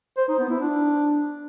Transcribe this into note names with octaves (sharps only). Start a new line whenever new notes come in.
C5
D#4
B3
E4
D4